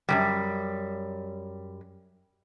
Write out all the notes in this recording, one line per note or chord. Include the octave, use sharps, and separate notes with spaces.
F#2 C3 G3